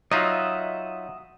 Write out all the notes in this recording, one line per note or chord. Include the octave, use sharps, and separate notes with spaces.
F#3 D#4 F4 D#5 E5 F#5